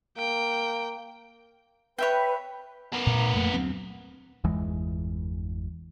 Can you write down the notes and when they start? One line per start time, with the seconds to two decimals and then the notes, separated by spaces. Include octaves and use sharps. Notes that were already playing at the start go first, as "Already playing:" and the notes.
0.18 A#3 G5
1.98 B4 C#5 E5 G5
2.93 B3 A#4
3.06 A#2
3.36 F2 A3 A#3
3.54 D2 F#3 C4
4.44 G1 E2 E3 G#3